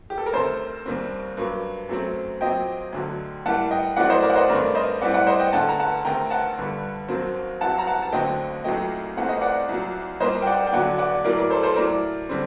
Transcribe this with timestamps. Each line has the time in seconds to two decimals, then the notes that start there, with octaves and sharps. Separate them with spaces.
0.10 G4
0.18 A4
0.26 A#4
0.33 D2 C3 D#3 A4 C5
0.85 D#2 D#3 G3 C4
1.37 G2 F#3 A#3
1.89 F#2 F#3 A3 C4
2.41 A#2 F#3 C4 D#5 G5
2.93 D2 D3 F#3
3.46 A2 G3 A#3 F#5 A5
3.71 D#5 G5
3.96 A2 F#3 A3 C4 D5 F#5
4.10 C5 D#5
4.22 A#4 D5
4.30 F#5
4.36 C5 D#5
4.48 G2 D#3 A3 C4 A#4 D5
4.75 C5 D#5
5.01 A2 G3 C4 D5 F#5
5.14 D5 F#5
5.27 C5 D#5
5.40 D#5 G5
5.52 D2 D3 A3 F#5 A5
5.69 A#5
5.80 F#5 A5
6.05 D2 C3 D#3 G5 A#5
6.30 F#5 A5
6.57 G2 D3 G3
7.08 D#2 D#3 F#3 C4
7.61 C2 C3 F#3 F#5 A5
7.78 A#5
7.87 F#5 A5
8.02 A5
8.12 D#2 D3 F#3 A3 C4 D#5 G5
8.64 C2 A#2 F#3 A3 D#5 G5
9.17 C2 A#2 A3 C4 F#5
9.29 D#5
9.41 D5 F#5
9.69 C2 A#2 F#3
10.20 C2 A#2 G3 A#3 C5 D#5
10.42 G5
10.47 D5 F#5
10.67 G5
10.72 D#2 D3 F#3 D5 F#5
10.98 D5 F#5
11.24 A2 F#3 A#3 A#4 D5
11.38 A#4 D5
11.50 A4 C5
11.63 A4 C5
11.76 A2 F#3 A#3 A#4 D5
12.29 D3 G3 C4